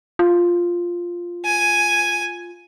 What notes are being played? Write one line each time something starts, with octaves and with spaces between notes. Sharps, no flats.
F4
G#5